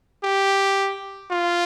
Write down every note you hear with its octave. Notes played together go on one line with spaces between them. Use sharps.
G4
F4